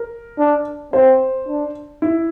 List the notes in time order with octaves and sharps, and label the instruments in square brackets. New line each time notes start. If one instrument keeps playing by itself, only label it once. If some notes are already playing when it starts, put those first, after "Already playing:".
Already playing: [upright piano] A#4
[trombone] D4
[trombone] C4 [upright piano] C5
[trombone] D4
[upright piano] E4